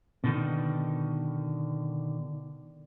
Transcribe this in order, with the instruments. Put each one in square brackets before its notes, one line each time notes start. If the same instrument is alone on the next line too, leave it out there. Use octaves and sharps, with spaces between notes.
[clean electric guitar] B2 D3 D#3